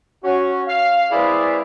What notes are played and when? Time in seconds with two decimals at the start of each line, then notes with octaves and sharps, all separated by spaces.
0.24 C#4 F#4
0.67 F5
1.12 G#3 C4 E4 G#4 B4 D5